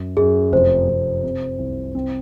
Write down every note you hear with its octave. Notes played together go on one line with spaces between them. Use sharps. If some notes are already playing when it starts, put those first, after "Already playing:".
Already playing: F#2
F#2 G#4
F1 C5
F1
C3
C2
C4